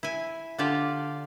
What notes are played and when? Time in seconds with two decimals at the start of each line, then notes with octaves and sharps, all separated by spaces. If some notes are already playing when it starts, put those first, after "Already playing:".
0.03 E4 G#5
0.59 D3 D4 F4 G4 D5